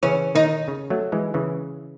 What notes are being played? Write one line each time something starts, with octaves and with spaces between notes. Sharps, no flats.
C#3 E3 C#4
D#3 D#4
C#3
F#3 A3
E3 G#3
C#3 E3